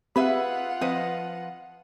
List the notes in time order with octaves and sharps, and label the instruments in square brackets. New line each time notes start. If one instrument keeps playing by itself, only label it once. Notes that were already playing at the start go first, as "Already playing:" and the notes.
[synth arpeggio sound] C4 G4 B5 [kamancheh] F4 F#5 [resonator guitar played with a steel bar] G#4 B4 E5
[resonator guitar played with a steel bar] F3 B4 D#5 [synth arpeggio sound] C4